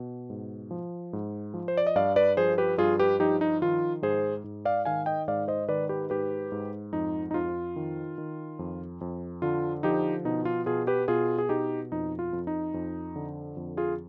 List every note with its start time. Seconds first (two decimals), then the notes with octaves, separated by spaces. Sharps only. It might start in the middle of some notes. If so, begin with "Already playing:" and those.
Already playing: B2
0.30 G#2
0.71 F3
1.13 G#2
1.54 F3
1.68 C5
1.77 D5
1.87 D#5
1.96 G2 D5 F5
2.16 B4 D5
2.37 F3 G#4 C5
2.58 G4 B4
2.78 G2 F4 G#4
2.99 G4 B4
3.19 F3 D#4 G4
3.41 D#4
3.62 D#3 F4
4.02 G#2 G#4 C5
4.44 G#2
4.65 D5 F5
4.85 D#3 F5 G#5
5.06 D#5 G5
5.28 G#2 D5 F5
5.48 C5 D#5
5.68 D#3 B4 D5
5.89 G4 B4
6.10 G#2 G4 B4
6.52 G#2
6.93 F2 D#4
7.31 D#4
7.34 F2 F4
7.76 D#3
8.18 D#3
8.59 F2
9.01 F2
9.42 D3 F4
9.83 F3 D#4 G4
10.25 B2 D#4
10.45 F4
10.66 B2 F4 G#4
10.87 G4 B4
11.08 B2 F4 G#4
11.38 G#4
11.49 B2 D#4 G4
11.92 F2 D#4
12.19 F4
12.33 F2
12.47 D#4
12.74 F2
13.16 D3
13.57 F2
13.77 F4 G#4